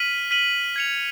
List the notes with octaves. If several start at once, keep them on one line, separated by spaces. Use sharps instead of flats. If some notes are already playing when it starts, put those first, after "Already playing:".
Already playing: F6 B6 D#7 F#7
F6 B6 D#7 F#7
G#6 C#7 F7